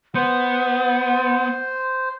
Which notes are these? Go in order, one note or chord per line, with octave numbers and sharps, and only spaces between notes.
B3 C5 F#5